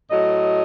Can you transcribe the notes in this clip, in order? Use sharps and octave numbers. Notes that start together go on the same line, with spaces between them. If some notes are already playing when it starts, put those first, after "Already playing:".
A2 F#3 D#5